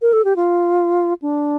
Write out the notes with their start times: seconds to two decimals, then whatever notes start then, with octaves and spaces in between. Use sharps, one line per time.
0.02 A#4
0.13 A4
0.25 G4
0.36 F4
1.22 D4